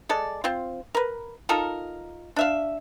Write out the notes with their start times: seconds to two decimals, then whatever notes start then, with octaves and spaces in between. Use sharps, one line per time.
0.09 G#3 A4 D5
0.44 C4 F4
0.95 A#4 B4
1.49 D#4 F4 A4 A#4
2.36 D4 E5 F5